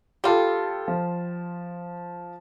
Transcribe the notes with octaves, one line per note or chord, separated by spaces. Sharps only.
G3 F4 G4 A4
F3